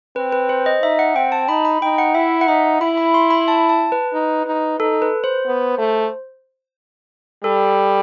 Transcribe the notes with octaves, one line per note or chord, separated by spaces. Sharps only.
C4 B4
B4
C5
D#5
D#4 E5
F#5
C4 G5
A5
D#4 B5
B5
D#4 G5
F#5
E4 E5
F#5
D#4 E5
E4 B5
B5
C6
B5
A5
A5
B4
D#4
D#4
D#4 A4
B4
C5
B3
A3
G3 A4